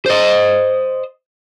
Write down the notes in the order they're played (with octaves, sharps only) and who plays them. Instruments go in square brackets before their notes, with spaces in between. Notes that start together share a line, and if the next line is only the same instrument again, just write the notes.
[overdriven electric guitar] C5 D#5